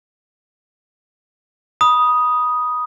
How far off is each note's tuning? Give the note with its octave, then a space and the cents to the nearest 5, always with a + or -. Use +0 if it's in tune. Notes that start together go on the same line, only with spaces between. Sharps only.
B5 -20 D#6 +0